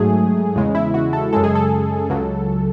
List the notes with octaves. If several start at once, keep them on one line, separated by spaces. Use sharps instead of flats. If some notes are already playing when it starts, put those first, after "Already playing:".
Already playing: G#2 F#3 A3 G#4
E2 C#3 G#3
E4
F#4
A4
F#2 C#3 G#3 A4
G#4
A4
C#2 C#3 F#3